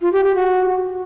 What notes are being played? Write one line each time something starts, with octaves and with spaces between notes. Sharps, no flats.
F4
G4
G4
F#4